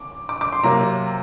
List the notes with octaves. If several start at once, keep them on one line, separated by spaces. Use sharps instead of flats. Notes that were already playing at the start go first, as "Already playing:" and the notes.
Already playing: D6
D6
D6
C6
C3 F#3 A#3 A#5